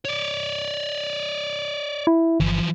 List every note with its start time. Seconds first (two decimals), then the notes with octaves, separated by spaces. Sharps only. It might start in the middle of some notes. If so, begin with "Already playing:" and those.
0.05 C#5 D5
2.07 E4
2.40 G1 E3 F3